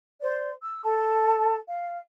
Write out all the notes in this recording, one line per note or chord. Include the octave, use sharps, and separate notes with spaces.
C5 D5
E6
A4 A5
F5